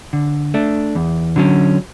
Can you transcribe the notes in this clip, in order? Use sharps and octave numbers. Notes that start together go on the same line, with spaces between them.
D3
A3 D4
E2
D3 F#3 C#4